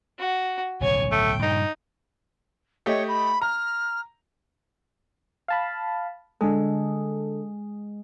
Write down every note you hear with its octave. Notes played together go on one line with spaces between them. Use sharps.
F#4
D1 B1 C#3 C#5 G#5
A3 G5
G2 A#2 C#3 D#4
A3 G4 C#5 D#5
B5
A#5 F6
F5 A5 B5
D3 G#3 A4